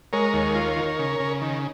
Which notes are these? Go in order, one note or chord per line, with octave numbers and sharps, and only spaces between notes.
G#3 A#4 C#5
D#2
F4
D#3
C#3
C#3
D#3